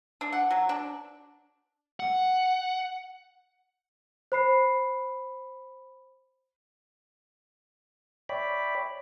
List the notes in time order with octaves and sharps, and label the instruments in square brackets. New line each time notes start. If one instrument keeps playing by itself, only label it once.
[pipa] D4
F#5
F#3
D4
[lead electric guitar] F#5
[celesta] C5 B5 C7
[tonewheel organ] C#5 D5 E5 G5 B5